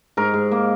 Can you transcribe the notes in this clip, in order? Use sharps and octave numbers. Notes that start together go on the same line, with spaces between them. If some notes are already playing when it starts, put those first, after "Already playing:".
G#2 A#4
G#2
A#3